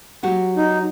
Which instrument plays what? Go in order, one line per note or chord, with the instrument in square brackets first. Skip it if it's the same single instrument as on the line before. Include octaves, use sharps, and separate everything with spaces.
[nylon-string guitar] F#3 F#4 G4
[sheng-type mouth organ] D#4